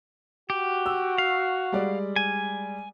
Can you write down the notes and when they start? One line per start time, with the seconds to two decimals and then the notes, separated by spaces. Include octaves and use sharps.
0.50 F#4 G4
0.86 E6
1.18 F5
1.72 G3 G#3 D5
2.16 G#5